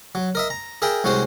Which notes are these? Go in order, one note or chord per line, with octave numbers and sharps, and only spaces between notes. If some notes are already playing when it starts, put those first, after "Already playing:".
F#3
A#4 D#5 E5
A#5
G#4 A#4 E5 G5
C2 G#3 C#4 F#4 C5